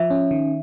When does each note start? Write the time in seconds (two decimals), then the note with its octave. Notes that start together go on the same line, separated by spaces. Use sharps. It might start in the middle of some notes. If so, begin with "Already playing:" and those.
Already playing: F3 E5
0.10 C#4
0.31 D#3